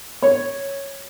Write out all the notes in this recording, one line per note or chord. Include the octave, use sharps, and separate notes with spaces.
C#5